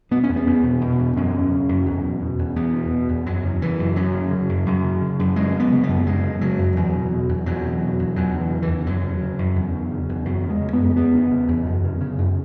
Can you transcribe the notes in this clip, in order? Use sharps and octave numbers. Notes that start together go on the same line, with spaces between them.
B2 B3
C#4
E2
B3
E2
B2
B2
E2
F#2 C#4
C#3
C#3
F#2
E2
B2
B2
E2
E2 B3
B2
B2
E2
F#2 F#3
C#3
C#3 E3
F#2
F#2 F#3
C#3
C#3
F#2
F#2
C#3
C#3
F#2
F#2 G#3
C#3
B3
C#3
B3
F#2
F#2 G#3
C#3
C#3 F#3
F#2
E2
B2
B2
E2
E2 F#3
B2
B2
E2
E2 F#3
C#3
E3
C#3
E3
E2
F#2 F#3
C#3
C#3
F#2
E2
C#3
C#3
E2
F#2 F#3
C#3
G#3
C#3
F#2 B3
E2 B3
C#3
C#3
E2
F#2
C#3
C#3
F#2